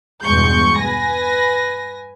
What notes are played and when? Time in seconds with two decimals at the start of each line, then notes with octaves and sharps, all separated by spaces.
0.23 E2 G2 B2 G#3 C#6 G6
0.79 B4 G#5 A#6